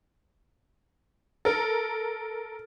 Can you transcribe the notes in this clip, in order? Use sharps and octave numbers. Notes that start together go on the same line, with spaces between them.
A4 A#4